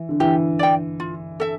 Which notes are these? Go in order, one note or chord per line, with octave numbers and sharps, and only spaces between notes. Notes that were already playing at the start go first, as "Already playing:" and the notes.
Already playing: E3
D3
E3 G4
D5 G5
F4
A4 E5